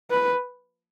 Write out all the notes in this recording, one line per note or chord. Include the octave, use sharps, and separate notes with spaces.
B4